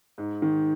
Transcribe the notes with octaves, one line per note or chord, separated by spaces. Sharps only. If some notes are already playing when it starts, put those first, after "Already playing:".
G#2
D#3